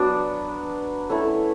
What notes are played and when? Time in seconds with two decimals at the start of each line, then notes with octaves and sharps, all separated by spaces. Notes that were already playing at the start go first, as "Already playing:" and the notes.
Already playing: F#3 B3 D4
1.10 A3 C#4 E4 A4